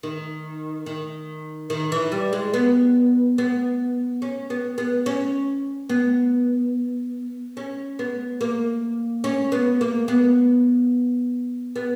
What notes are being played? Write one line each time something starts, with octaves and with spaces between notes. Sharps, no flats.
D#3
D#3
D#3
E3
G3
G#3
B3
B3
C#4
B3
B3
C#4
B3
C#4
B3
A#3
C#4
B3
A#3
B3
B3